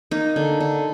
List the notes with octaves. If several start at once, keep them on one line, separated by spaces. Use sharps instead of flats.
A#3 D#4
D3
D3